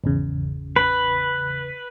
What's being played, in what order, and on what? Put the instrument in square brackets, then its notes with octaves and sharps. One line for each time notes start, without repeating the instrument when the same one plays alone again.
[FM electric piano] G#1 E2 C#3
[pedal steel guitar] B4